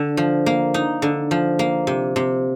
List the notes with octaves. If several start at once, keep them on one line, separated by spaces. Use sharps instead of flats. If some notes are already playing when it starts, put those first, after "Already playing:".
Already playing: D3
F3
A#3
D#4
D3
F3
A#3
C3
C3